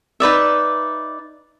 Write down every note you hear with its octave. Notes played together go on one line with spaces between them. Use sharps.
D#4 B4 D5 E5